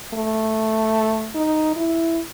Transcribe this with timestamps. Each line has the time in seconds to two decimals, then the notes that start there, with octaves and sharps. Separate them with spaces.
0.14 A3
1.35 D#4
1.76 E4